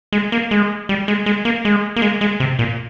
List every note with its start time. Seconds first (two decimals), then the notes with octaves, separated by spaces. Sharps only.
0.12 G#3
0.32 A#3
0.51 G#3
0.89 G3
1.08 G#3
1.26 G#3
1.45 A#3
1.65 G#3
1.96 A#3
2.02 G#3
2.21 G#3
2.40 C3
2.59 A#2